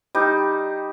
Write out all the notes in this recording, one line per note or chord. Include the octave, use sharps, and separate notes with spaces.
G3 D#4